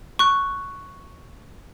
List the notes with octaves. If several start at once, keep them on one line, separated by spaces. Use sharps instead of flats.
C#6 F#6